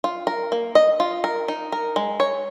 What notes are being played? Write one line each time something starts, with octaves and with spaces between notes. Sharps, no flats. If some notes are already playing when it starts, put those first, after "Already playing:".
F4
A#4
A#3
D#5
F4
A#4
D#4
A#4
G#3
C#5